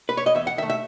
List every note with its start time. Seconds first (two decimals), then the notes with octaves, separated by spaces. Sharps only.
0.09 B4
0.17 C#5
0.26 D#5
0.35 E2 E5
0.47 F#5
0.58 D#3 E5
0.62 A3
0.70 E5